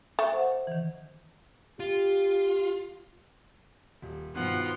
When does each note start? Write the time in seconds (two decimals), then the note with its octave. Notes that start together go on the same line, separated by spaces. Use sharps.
0.19 A3
0.32 C5 F#5
0.67 D#3 E3
1.80 F4 G4
4.02 D#1
4.35 G2 B2 D#3 F3 B3 F#5 C6